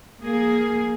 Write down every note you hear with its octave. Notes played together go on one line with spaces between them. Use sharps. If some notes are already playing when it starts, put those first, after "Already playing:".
A#3 G#4